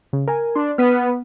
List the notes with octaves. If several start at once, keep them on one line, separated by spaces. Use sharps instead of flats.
C#3
A#4 G#5
D4 C6
B3 F6 B6 D#7